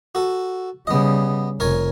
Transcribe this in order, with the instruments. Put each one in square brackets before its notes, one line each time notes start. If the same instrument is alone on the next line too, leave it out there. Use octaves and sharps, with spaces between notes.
[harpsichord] F#4 A4
[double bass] C#3 G3 [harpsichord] B3 D#5
[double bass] F1 [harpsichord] A#4 C#5 G#5